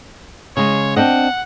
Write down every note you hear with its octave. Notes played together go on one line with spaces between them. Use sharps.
C#3 G#3 C#5
C4 D4 D#5 F#5